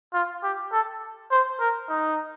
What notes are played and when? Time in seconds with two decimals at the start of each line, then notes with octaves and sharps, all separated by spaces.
0.14 F4
0.43 G4
0.72 A4
1.31 C5
1.60 A#4
1.89 D#4